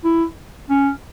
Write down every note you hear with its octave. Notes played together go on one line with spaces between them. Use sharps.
E4
C#4